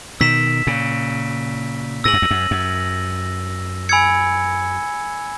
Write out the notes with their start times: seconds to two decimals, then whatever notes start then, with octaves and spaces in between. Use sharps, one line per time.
0.20 B2 D#3 E6 B6 E7
0.67 A#2 C#3
2.04 G#2 E6 A#6 D#7 F#7
2.13 F#2
2.22 E2
2.31 F#2
2.51 F#2
3.89 G#5 B5 E6 G#6 C#7